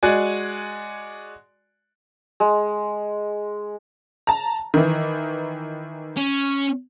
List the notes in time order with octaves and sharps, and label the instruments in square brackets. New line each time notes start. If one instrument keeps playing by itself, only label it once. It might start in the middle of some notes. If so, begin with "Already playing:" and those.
[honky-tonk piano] G#3 F#4 D5 G#5
[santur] G#3
[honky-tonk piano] A5 A#5
D#3 E3
[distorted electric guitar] C#4